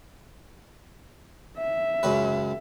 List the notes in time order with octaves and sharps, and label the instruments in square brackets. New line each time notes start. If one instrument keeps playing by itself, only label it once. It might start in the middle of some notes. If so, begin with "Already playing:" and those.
[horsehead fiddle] E5
[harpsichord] C#2 F#2 B4